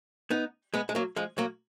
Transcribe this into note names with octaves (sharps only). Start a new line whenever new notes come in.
B3 D#4
G#3 B3
G#3
F#3 A#3
F3 G#3
F#3 A#3